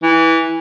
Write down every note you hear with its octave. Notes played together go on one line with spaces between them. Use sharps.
E3